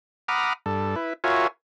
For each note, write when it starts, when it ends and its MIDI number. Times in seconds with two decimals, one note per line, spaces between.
0.28 0.53 78
0.28 0.53 82
0.28 0.53 83
0.28 0.53 86
0.28 0.53 87
0.28 0.53 89
0.66 0.95 43
0.66 0.95 69
0.96 1.13 64
0.96 1.13 71
1.24 1.47 65
1.24 1.47 66
1.24 1.47 70
1.24 1.47 73
1.24 1.47 76
1.24 1.47 80